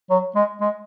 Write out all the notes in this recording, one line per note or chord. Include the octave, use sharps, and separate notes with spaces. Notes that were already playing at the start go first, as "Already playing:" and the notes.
F#3
G#3
G#3